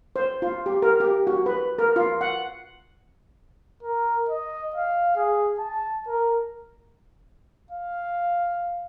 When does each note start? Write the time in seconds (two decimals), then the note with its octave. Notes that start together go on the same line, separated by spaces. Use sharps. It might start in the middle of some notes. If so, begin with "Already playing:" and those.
0.16 C5
0.42 F4
0.66 G4
0.82 A#4
1.00 G4
1.27 F#4
1.46 B4
1.79 A#4
1.96 F4
2.21 F#5
3.83 A#4
4.29 D#5
4.75 F5
5.16 G#4
5.59 A5
6.07 A#4
7.71 F5